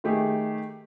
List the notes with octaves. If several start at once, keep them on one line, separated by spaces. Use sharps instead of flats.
D#3 A3 G4 G#4